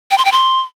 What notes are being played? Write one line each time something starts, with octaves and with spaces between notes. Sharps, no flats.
G5
C6
G5
C6